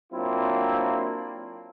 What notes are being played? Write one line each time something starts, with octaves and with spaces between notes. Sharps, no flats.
F#3 A#3 C4 D4 E4 F4